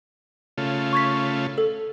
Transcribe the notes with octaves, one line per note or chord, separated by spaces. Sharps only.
C#3 A3 F4
C#6 G#6 B6
A4